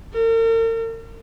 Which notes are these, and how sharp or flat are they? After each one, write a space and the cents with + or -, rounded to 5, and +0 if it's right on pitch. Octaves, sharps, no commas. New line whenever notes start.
A#4 -45